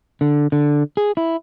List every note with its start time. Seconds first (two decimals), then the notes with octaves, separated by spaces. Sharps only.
0.21 D3
0.52 D3
0.97 G#4
1.17 E4